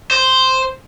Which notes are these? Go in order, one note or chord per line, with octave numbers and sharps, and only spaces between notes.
C5